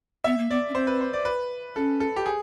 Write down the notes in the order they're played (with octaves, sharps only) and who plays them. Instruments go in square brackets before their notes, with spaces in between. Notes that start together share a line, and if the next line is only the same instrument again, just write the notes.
[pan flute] B3 [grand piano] E5
[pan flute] A#3
[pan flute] B3 [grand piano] D5
[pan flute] C#4
[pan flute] C4 [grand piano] C5
[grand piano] B4
C5
D5
B4
[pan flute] C#4 [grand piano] A4
[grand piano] A4
G4
G#4